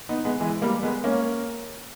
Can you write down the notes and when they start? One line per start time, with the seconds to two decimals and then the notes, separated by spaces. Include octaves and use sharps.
0.09 B3 D#4
0.25 G#3 B3
0.40 E3 G#3
0.62 G3 A#3
0.83 G#3 B3
1.04 A#3 C#4